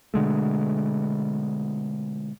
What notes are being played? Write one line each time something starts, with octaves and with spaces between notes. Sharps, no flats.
B2 D3 G#3 A3